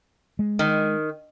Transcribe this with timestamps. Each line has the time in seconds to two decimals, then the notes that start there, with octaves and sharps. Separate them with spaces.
0.39 G#3
0.59 D#3